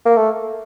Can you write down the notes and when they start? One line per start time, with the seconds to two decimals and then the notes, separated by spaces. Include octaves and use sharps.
0.05 A#3
0.17 A3